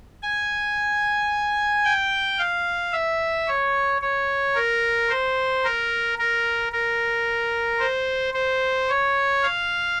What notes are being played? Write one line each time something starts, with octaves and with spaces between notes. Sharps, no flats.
G#5
G5
F5
E5
C#5
C#5
A#4
C5
A#4
A#4
A#4
C5
C5
C#5
F5